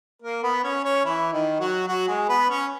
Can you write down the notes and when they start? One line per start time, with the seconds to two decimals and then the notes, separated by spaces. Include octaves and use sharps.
0.22 A#3 A#4
0.43 B3 B4
0.64 C#4 C#5
0.84 C#4 C#5
1.05 E3 E4
1.32 D#3 D#4
1.60 F#3 F#4
1.87 F#3 F#4
2.08 G#3 G#4
2.29 B3 B4
2.49 C#4 C#5